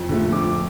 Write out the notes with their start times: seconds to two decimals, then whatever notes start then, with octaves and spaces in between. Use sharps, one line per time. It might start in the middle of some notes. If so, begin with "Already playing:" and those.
Already playing: F2
0.09 D3 F3 A3
0.32 F2 D6